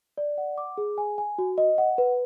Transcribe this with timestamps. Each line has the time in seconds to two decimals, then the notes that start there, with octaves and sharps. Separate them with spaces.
0.18 D5
0.38 F#5
0.58 D6
0.78 G#4
0.98 G#5
1.18 G#5
1.38 F#4
1.58 D#5
1.78 F#5
1.98 B4